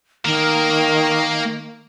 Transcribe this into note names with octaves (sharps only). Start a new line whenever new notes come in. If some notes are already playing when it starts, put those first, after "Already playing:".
D#3 A#3 A#4